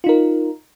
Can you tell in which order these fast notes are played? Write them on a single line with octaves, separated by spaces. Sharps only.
F4 D#4 A#4